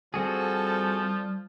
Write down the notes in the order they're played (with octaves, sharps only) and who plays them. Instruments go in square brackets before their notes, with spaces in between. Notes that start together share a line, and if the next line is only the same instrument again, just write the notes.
[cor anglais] F3 [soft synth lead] G3 [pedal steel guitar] C4 F#4 G#4 [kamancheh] A4